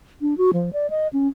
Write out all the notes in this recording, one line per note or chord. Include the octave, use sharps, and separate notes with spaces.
D4
F#4
F3
D5
D#5
C#4